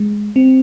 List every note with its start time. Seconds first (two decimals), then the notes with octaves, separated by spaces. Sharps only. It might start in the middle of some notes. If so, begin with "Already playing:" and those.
Already playing: G#3
0.36 C4